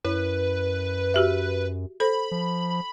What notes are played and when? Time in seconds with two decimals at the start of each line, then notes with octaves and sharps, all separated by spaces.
0.05 F#2 E4 B4 C#5
1.14 F#4 G4 E5
2.00 A4 C5 B5
2.31 F3